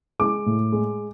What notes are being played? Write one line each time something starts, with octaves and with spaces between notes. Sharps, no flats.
G#3 D6
A2
G#3